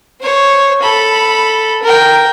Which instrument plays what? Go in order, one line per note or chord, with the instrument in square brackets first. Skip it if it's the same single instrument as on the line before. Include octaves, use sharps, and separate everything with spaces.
[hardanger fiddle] C5 C#5
A4 B5
A#4 G5